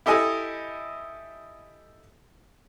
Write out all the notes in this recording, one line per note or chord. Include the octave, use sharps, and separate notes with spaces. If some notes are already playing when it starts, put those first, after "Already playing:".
E4 G4 A4 D#5 G#5